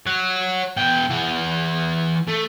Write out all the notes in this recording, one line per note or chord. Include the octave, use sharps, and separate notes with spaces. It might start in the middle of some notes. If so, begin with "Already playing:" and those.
C#5 F#5
B2 G5
E3 F#5
A3